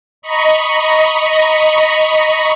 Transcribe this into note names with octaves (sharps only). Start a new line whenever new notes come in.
D#5 A#5 B5 C#6